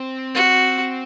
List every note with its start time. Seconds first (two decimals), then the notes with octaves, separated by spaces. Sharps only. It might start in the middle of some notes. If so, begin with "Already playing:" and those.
Already playing: C4
0.34 F#4